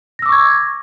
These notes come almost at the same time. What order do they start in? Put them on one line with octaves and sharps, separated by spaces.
A#6 E6 D6 C#6 G#6